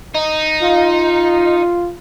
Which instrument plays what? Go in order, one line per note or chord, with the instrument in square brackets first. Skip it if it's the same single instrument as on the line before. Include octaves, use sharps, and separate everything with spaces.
[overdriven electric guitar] D#4
[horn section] F4